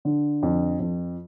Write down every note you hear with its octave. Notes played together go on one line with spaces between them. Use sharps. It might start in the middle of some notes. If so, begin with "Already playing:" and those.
D3
F2
F2